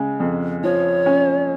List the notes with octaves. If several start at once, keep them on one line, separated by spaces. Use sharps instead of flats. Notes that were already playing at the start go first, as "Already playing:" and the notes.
Already playing: C#3 G#3
F2
F3 C#5
C#4